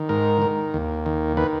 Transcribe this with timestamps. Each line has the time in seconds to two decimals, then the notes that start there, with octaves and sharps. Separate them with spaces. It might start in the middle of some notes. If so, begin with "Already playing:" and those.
Already playing: D#3
0.09 G#2 A#4
0.42 D#3
0.74 D#2
1.06 D#3
1.37 D#3 B4